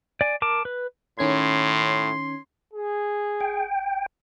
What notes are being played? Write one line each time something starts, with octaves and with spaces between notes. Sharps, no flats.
D5 G#5
A#4 A5 D6
B4
A2 D#3 C#4 C6 G#6
G#4
G5